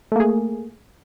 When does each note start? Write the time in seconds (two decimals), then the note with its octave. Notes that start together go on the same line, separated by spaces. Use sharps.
0.12 A3
0.16 A#3
0.20 G#4